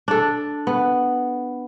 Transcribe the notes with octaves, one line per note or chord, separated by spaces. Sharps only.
D4 A4
B3